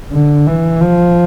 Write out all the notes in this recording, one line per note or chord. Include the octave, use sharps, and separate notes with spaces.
D3
E3
F3